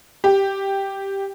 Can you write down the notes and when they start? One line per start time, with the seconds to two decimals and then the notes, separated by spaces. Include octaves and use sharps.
0.24 G4